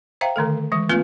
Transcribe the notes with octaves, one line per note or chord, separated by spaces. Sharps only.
C5 E5 F5 G5 A#5
D3 D#3 A3 A4
E3 G#3
A3 A#3 C4 F4 B4